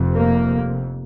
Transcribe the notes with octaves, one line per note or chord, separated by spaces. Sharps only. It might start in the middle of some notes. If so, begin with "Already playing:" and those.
Already playing: F1 F2 C3
A#3